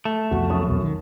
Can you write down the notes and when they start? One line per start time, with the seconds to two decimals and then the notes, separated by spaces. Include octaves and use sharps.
0.05 A3
0.31 C2 F2 B2 F#4 F#5 C#6
0.50 F#2 C#6 D#6
0.67 B1 E2 B2
0.82 D#3